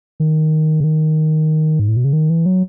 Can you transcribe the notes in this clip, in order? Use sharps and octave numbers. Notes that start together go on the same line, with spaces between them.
D#3
C#3
D#3
G#2
A2
B2
C#3
D#3
E3
F#3